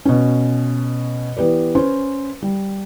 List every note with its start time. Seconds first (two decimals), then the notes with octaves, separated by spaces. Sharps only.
0.05 B2 C#4
1.37 E3 B3 G4 B4 D5
1.75 C#4 B4 C5
2.42 G3